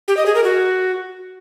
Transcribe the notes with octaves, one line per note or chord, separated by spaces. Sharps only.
G4
D#5
G#4
A#4
F#4